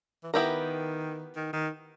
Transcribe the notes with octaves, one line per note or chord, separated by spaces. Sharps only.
E3
D#3 B3 E4 G4 A#4
D#3
D#3